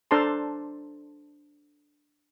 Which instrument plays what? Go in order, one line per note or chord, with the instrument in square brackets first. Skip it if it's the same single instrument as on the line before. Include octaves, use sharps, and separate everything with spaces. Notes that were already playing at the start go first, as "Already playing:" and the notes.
[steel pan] D4 A4 C5 A5 A#5 C6